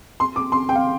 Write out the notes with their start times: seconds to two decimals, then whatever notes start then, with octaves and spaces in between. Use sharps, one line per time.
0.20 C6
0.36 D6
0.52 C6
0.69 G5
0.75 F5